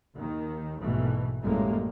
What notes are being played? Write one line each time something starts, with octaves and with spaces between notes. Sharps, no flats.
D#2 D#3
A#1 G#2 B2 E3 A3
A1 F#2 A2 G3 G#3 A#3